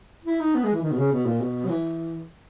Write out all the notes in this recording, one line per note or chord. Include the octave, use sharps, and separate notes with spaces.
E4
D#4
B3
G#3
E3
D#3
B2
C#3
B2
A#2
B2
F#3
E3